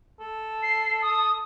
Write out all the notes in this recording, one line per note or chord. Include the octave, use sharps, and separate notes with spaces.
A4
C7
D#6